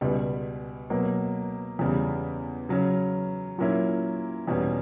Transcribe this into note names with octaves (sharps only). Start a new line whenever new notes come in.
C#2 B2 G3
B2 F#3 A#3
E2 C#3 G3
C#3 F#3 C#4
A#2 F#3 A#3 C#4 E4
E2 B2 G3 C#4